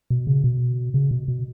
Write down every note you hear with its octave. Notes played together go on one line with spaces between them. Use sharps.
B2
C#3
B2
C#3
B2
B2